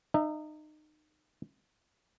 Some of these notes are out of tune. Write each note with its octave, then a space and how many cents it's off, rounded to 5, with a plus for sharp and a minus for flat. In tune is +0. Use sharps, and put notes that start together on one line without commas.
D#4 -25 E5 +0